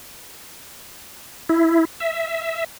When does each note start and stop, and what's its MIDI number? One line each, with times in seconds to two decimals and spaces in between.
1.49 1.85 64
2.00 2.64 76